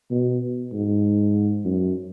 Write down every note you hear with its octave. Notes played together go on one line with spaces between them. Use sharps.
B2
G#2
F#2